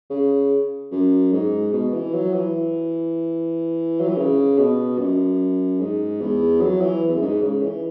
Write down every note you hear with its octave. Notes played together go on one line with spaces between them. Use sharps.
C#3
F#2
G#2
B2
E3
F#3
E3
F#3
E3
C#3
B2
F#2
G#2
E2
F#3
E3
E2
F#2
G#2
C#3
E3